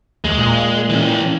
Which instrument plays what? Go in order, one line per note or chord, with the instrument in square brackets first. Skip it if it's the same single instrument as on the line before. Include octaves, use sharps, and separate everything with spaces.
[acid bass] D#2 [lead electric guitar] G#3
[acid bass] A#2
[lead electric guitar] E3 C#4